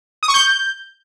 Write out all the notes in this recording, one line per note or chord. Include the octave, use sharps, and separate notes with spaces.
D#6
C#6
G6